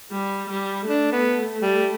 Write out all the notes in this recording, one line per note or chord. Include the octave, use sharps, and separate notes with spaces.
G3
G3
A3 D4
B3
G3